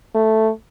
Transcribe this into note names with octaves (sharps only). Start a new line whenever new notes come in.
A3